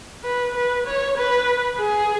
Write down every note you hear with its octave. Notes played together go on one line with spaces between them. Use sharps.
B4
B4
C#5
B4
G#4